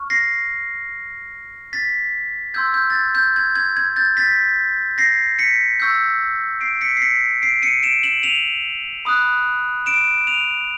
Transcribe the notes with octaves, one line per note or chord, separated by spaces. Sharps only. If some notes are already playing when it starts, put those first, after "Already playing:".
Already playing: C#6 F6
A#6 C7
A6 B6
C6 E6 G6 G#6
G6
A6
G#6
G6
G#6
G#6
G#6
G6 A6
A6 B6
A#6 C7
B6 C#7
C#6 E6 G6
C7 D7
B6 C#7
C7
B6 C#7
C7 D7
C#7 D#7
D7 E7
E7 F#7
D#7 F7
B5 D#6 F#6
D7 E7
D#7 F7